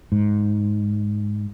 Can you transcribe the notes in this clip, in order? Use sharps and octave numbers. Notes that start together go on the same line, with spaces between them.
G#2